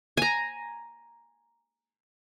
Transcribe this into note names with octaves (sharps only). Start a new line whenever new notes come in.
G#5 A#5